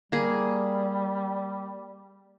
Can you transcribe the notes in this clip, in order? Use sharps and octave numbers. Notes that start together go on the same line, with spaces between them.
G3 A#3 G#4